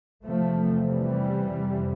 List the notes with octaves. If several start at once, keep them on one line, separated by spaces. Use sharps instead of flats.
E2 C3 F3 A3
E3 G3
F2 C3